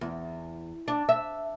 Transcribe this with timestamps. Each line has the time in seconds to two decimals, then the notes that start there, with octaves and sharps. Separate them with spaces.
0.01 E2
0.88 D4
1.09 E5